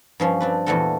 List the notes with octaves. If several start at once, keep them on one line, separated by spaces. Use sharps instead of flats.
G2 F3 C#4
C4 D4 B4
E2 A#2 G3 A3 F#4 A4